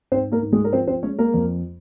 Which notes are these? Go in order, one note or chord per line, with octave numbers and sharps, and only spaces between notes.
G#2 C4 C5
A#3 A#4
G#2
G#3 G#4
A#4
F3 C4 C5
C4 C5
G#3 C#4 C#5
A#3 A#4
F2